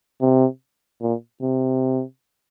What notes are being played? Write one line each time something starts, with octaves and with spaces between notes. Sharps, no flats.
C3
A#2
C3